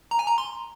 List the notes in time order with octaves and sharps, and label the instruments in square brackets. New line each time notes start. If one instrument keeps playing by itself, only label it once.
[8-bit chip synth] A#5
G#5
A#5
C6